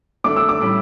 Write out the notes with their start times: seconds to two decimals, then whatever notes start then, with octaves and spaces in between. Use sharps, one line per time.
0.24 D3 A3 D4 D6
0.36 E6
0.49 D6
0.60 A2 G3 C#4